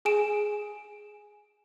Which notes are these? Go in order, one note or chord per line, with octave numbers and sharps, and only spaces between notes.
G#4 G#5 D7 E7